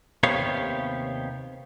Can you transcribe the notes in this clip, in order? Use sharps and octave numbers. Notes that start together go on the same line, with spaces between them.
D#2 C3 B3 G4 C#5 F5